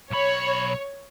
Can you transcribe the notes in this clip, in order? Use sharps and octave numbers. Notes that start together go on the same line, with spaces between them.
B1 C#5 B5